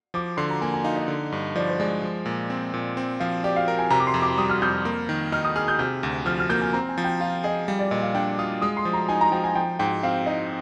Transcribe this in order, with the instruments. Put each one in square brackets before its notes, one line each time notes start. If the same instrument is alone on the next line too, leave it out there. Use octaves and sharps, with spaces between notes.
[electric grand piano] F3 [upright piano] D6
[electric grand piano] D3 [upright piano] C6
[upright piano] A#5
[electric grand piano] A#3 [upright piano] G#5
[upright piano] G#5
[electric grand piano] D#4 [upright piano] F5
[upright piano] D#5
[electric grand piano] D3
G2
[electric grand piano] F3 [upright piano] D5
[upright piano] C5
[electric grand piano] G#3 [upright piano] D5
[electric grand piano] F3
A#2
C4
A#2
C4
[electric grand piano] F3 [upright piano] F5
[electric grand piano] G4 [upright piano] D5
[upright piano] F5
[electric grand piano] A#4
[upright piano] G#5
[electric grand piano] C3 [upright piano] A#5
[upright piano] D6
C6
[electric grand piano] F2
[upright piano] D6
[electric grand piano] G3 [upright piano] D#6
[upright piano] F6
[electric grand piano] F2 [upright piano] G6
[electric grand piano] A#3
D#3
[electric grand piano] D#4 [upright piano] F6
[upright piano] D#6
[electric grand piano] G#4 [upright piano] F6
[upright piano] G6
[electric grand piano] C3 [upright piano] G6
[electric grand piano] D2
[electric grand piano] F3 [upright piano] F6
[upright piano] F6
[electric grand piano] A#3 [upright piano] G6
[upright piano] G#5
[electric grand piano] C4 [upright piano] A#5
[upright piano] G#5
[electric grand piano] F3
[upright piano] G5
[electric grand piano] F4 [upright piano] F5
[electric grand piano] G#4 [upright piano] D#5
[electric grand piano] G3 [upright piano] F5
[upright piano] D5
[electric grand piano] A#2 [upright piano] D#5
[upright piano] F5
[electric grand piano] D4 [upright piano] G5
[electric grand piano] F4 [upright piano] D#6
[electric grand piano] G#3 [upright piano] D#6
[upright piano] C6
[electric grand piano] F3
[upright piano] A#5
[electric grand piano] D#4 [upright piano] G#5
[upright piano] A#5
[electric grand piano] F3 [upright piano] G5
[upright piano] G#5
[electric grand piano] F3 [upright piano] G5
[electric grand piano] G#2 [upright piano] G5
[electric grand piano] C4 [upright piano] F5
[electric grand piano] D#4 [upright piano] D#5